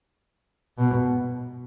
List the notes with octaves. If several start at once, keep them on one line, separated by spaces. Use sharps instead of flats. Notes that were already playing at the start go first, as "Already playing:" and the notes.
B2